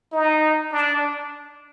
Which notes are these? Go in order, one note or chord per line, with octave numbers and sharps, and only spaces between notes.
D#4
D4